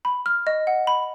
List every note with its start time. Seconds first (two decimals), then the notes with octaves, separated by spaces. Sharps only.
0.05 B5
0.26 F6
0.47 D#5
0.67 F#5
0.87 B5